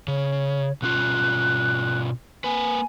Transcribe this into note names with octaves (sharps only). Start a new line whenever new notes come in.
C#3 C#5
B2 C#4 F4 F#6
A#3 B4 G#5